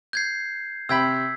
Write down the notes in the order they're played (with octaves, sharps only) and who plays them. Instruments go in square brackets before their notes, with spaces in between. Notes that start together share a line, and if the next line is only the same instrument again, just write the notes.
[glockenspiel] G6 G#6 C7
[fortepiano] C3 G5 B5 [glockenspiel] E6 G#6 B6